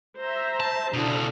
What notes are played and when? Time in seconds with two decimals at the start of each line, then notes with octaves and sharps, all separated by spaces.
0.19 C5 E5 A#5
0.60 A5
0.93 C#2 B2 D3 E4